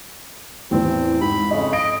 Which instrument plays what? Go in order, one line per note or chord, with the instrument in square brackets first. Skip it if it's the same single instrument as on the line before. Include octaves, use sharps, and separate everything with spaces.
[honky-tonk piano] E2 A2 E3 [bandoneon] C4
[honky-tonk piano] G#2 [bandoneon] B5
[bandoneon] F2 C#3 [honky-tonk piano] D#5
[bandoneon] D#5 [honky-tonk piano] D7